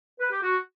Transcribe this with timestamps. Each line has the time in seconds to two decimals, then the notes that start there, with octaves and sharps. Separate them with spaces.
0.20 B4
0.31 G4
0.42 F#4